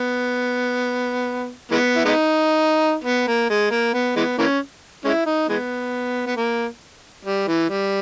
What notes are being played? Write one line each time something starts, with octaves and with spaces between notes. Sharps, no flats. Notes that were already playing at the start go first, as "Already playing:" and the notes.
Already playing: B3
E3 G#3 B3
E4
G#3 B3 D#4
B3
A#3
G#3
A#3
B3
E3 G#3 B3
E3 A#3 C#4
G#3 C#4 E4
D#4
E3 G#3 B3
B3
A#3
G3
E3
G3